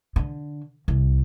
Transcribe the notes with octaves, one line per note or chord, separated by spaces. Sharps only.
D3
C2